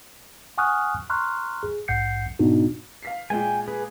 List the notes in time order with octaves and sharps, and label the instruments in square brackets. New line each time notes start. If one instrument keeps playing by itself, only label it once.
[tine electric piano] F#5 G#5 C#6 D#6 F6 F#6
A#5 C6 C#6 F6 F#6
G#4
A#1 G#2 F#5 G6 C7 C#7
G#2 B2 B3 D4 D#4 F#4
[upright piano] F5 B6 C7
[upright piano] A#2 G#3 [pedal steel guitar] G5 G#5
[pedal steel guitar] G#4 B4